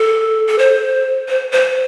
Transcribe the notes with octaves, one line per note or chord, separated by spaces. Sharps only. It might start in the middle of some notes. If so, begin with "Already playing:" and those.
Already playing: A4
A4
C5
C5
C5